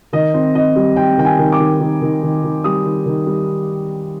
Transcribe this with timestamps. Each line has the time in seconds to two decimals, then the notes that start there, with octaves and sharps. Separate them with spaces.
0.13 D#3 D#5
0.34 C4
0.55 C4 D#5
0.76 G3
0.96 C4 G5
1.18 D#3 G5
1.25 G#5
1.39 D#3
1.52 D6
1.59 D#3
1.80 D#3
2.02 D#3
2.23 D#3
2.44 D#3
2.64 G3 D#6
2.85 D#3
3.06 D#3
3.26 G3